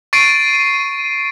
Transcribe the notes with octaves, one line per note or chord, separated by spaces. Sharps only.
C#6 A6 C7 D7 D#7